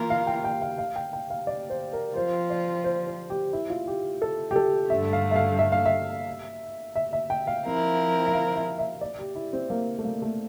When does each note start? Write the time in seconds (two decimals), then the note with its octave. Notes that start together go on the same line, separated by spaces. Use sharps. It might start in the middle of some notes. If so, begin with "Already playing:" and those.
Already playing: E3 A#3 F4 A#4
0.10 F5
0.27 G5
0.44 G5
0.62 F5
0.78 F5
0.96 G5
1.13 G5
1.30 F5
1.47 D5
1.70 C5
1.93 A#4
2.15 F3 C4 F4 C5
2.50 D5
2.84 C5
3.07 C5
3.30 G4
3.53 E4
3.70 F4
3.87 G4
4.22 A4
4.51 G4
4.56 A4
4.90 G2 D3 A3 E5
5.13 F5
5.31 E5
5.36 F5
5.59 E5
5.72 F5
5.86 E5
6.96 E5
7.13 E5
7.30 G5
7.47 F5
7.64 F3 C4 E4 A#4
8.26 E5
8.33 F5
8.56 E5
8.79 E5
9.01 D5
9.19 G4
9.35 E4
9.53 C4
9.70 A#3
9.98 A3
10.05 A#3
10.22 A3